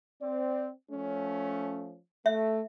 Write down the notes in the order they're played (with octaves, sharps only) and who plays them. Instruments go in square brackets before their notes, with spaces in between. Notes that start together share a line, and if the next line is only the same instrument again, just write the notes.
[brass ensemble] C4 D5
F3 A3 C#4
[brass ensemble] A3 [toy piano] E5